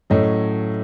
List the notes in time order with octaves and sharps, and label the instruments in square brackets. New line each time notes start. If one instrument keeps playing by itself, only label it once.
[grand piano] A2 F#3 A3 C#4 D#5